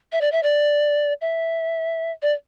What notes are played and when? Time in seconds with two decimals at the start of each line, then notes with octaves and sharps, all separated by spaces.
0.12 E5
0.21 D5
0.32 E5
0.43 D5
1.21 E5
2.22 D5